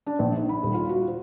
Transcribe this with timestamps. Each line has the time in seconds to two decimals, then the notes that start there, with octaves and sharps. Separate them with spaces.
0.06 D4
0.19 A#1
0.35 D#4
0.49 B5
0.63 D#1
0.74 F4
0.89 F#4
1.08 C5